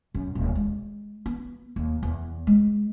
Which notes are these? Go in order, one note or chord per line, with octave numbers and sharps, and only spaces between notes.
F#2
D#1
G#3
B3
D#2
E2
G#3